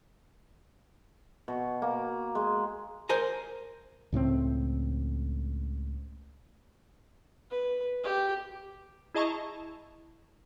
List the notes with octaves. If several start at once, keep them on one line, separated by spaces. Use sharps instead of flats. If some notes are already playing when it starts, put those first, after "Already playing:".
B2
A#3
G#3
A#4 C5 G#5 A#5
C#2 A2 F#3 C4
B4
G4
E4 G#4 D#5 A5 A#5 C#6